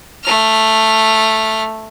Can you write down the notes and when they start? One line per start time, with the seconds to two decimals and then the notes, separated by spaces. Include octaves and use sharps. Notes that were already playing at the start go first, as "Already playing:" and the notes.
0.24 A3 F6